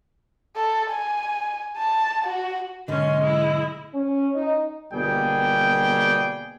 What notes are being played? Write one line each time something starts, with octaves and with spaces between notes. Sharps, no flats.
A4
G#5
A5
F#4
B1 G#2 D3 C#4 D#5 C6
G#3 E4
C#4
D#4
G1 B2 G3 A#3 G#4 G5